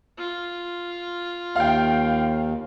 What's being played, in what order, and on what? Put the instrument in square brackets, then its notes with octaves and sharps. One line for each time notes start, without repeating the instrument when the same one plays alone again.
[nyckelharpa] F4
[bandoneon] D#2 [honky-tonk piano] F5 G5